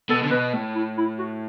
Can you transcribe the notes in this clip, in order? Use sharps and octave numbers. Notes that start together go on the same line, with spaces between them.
B2 A4
D3
B2 B4
A2
E4
E4
F#4